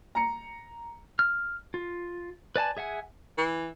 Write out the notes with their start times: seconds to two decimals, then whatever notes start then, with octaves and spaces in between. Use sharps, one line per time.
0.15 A#5 C#7
1.19 F6
1.74 F4
2.56 B4 D5 G#5 A5
2.77 G#4 E5 F#5 G#5
3.38 E3